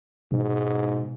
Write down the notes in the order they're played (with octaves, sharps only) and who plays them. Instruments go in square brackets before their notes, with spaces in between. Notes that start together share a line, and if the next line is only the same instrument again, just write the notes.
[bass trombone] G#2 [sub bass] B2